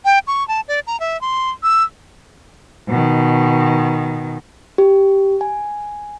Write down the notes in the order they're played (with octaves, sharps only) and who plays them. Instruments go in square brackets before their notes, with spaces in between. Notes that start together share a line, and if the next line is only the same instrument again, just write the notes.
[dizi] G5
C#6
A5
D5
A#5
E5
C6
E6
[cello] B2 D#3
[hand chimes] G4
G#5